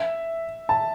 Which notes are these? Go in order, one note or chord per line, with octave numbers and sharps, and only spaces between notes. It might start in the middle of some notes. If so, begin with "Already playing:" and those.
Already playing: E5
A5